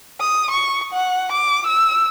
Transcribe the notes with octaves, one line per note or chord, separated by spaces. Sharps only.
D#6
C#6
F#5
D6
E6